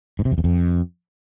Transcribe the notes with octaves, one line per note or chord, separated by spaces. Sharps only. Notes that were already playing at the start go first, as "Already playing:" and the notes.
G#2
C3
F2
E2
F2